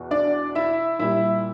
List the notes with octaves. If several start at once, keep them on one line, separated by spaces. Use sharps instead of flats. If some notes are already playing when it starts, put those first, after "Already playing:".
Already playing: E2 B2
D4 D5
E4 E5
A#2 G3 E4 E5